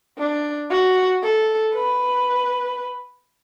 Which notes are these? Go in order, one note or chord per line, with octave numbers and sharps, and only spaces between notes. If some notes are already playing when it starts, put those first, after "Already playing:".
D4
F#4
A4
B4